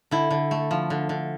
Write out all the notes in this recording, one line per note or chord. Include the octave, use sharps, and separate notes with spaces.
D3 E4
D3
A3
F3
D3
D3